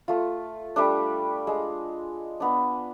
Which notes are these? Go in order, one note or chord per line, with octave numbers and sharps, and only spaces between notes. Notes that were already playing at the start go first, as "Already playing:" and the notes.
A3 F4
G3 A3 D4
G#3
B3 D4